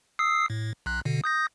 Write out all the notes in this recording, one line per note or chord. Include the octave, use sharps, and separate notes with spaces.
D#6 E6 C7
A2
B1 F#6
B2 D3
D#6 G6 A#6